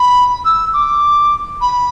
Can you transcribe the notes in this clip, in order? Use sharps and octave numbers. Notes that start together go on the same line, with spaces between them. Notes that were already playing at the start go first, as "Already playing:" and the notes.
Already playing: B5
E6
D6
B5